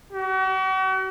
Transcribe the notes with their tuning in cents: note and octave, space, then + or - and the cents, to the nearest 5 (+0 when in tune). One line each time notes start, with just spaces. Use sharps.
F#4 +40